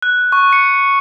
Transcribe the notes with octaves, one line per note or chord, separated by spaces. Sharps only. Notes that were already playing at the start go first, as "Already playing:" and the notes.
F#6
C#6
C#7